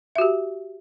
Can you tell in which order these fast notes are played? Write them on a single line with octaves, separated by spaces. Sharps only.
E5 F#4 G4